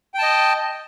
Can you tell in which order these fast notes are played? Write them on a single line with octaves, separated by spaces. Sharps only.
G5 A5 D#5